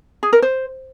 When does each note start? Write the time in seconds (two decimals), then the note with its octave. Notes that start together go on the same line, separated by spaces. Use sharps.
0.23 G#4
0.33 A#4
0.42 C5